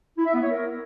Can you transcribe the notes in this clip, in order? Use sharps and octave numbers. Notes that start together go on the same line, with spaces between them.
E4
E5
B3
C#5
A#4